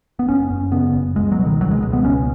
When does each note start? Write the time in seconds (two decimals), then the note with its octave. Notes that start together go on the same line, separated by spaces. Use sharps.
0.19 B3
0.28 F#1 C#4
0.50 F#2
0.71 C#3 B3
0.94 F#1
1.16 C#2 G#3
1.32 F#3
1.38 B2
1.45 D#3
1.61 C#2 F#3
1.71 G#3
1.82 B2 G#3
1.93 B3
2.04 C#2 C#4